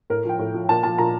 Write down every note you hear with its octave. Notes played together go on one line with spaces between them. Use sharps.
A2 A#4
F3 G5
A2
F3
A#2 A5
F3 A5
A#2 A#5